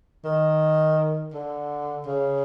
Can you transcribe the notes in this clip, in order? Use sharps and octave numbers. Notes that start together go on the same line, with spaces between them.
D#3
D3
C#3